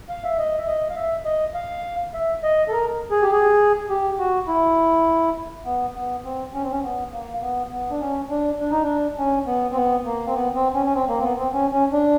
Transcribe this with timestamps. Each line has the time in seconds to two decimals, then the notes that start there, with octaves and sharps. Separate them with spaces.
0.09 F5
0.24 E5
0.38 D#5
0.58 E5
0.67 D#5
0.90 F5
0.96 E5
1.25 D#5
1.54 F5
2.14 E5
2.43 D#5
2.68 A4
2.72 A#4
3.11 G#4
3.22 G4
3.31 G#4
3.90 G4
4.19 F#4
4.48 E4
5.66 B3
5.96 B3
6.24 C4
6.54 C#4
6.63 C4
6.72 C#4
6.83 B3
7.13 A#3
7.42 B3
7.70 B3
7.91 D4
8.01 C#4
8.30 D4
8.60 D4
8.71 D#4
8.83 D4
9.18 C#4
9.47 B3
9.72 C4
9.76 B3
10.05 A#3
10.27 C4
10.35 B3
10.55 C4
10.75 C#4
10.86 C#4
10.94 C4
11.09 A#3
11.19 C4
11.23 B3
11.38 C4
11.53 C#4
11.72 C#4
11.92 D4